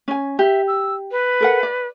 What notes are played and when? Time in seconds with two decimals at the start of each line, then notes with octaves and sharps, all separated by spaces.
0.08 C#4 G#5
0.39 G4 E5
0.68 E6
1.11 B4
1.41 A4 A#4 F#5
1.63 D5